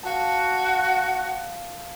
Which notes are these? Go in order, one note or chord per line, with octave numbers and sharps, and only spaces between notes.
F#4 F5 A5